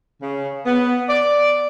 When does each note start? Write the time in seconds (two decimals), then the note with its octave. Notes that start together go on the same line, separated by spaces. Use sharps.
0.22 C#3
0.65 B3
1.09 D5